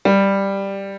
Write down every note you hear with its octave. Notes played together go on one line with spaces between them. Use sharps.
G3